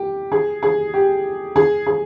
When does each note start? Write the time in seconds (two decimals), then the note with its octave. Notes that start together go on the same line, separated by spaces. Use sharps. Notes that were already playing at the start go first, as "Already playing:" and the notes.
Already playing: G4
0.32 G#4
0.63 G#4
0.94 G4
1.56 G#4
1.87 G#4